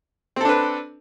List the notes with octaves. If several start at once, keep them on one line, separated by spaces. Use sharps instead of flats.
C4 D4 A4 B4